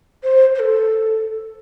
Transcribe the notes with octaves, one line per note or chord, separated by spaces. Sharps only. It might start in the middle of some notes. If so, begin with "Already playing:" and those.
C5
C5
A4